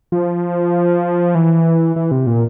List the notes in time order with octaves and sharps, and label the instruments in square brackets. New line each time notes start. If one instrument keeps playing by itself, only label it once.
[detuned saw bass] F3
E3
E3
C3
A#2